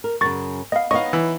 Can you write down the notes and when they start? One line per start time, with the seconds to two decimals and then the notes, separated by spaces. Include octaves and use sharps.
0.04 A#4
0.21 F#2 C#3 C#6 A6
0.72 B3 D#5 F5
0.91 B3 D#4 C#5 D#5 F5 C#6
1.13 E3